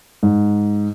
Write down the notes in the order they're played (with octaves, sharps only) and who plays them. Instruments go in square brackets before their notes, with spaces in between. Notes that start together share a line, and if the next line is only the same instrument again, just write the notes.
[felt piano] G#2